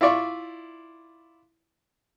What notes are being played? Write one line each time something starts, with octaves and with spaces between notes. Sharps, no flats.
E4 F4 D5 C#6